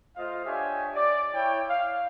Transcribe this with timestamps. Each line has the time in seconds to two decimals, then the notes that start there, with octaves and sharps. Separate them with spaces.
0.16 A3 F4 C5 D#5 F5
0.45 D4 G4 C#5 D#5 E5 G#5
0.95 D5
1.34 E4 C#5 G5
1.69 F5